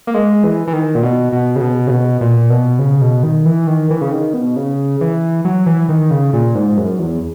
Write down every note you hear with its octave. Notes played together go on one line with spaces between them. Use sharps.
A#3
G#3
E3
E3
D#3
A#2
B2
B2
C#3
B2
C#3
B2
A#2
B2
C#3
B2
D#3
E3
D#3
E3
C#3
D#3
B2
C#3
E3
F#3
E3
D#3
C#3
A#2
G#2
F#2
E2